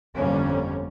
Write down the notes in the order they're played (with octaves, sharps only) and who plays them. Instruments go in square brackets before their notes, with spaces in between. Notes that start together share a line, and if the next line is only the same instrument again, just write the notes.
[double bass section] G1 F2 D3 G3 A#3 C#4